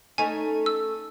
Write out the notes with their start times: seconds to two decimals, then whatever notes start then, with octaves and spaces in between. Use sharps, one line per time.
0.18 A3 C#4 D#4 G#5
0.66 E6